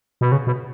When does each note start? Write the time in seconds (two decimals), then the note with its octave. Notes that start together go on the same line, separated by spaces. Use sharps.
0.21 B2
0.32 C#3
0.47 B2